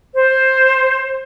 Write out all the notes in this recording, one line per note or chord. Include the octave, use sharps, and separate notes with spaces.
C5